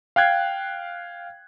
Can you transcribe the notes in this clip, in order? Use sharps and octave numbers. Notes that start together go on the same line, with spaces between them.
F5 G5 F#6 G#6 C7